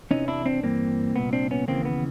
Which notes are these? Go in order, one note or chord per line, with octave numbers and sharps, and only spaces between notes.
E2 C3 E3 C#4 D#4
D4 E4
C4 D4
G2 E3 A#3 C4
C2 A#2 B3
C4 D4
B3 C#4
D#2 C#3 E3 A#3 C4
B3